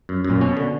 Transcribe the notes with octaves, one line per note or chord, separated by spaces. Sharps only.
F#2
F#2
A#2
B2 C#4
D3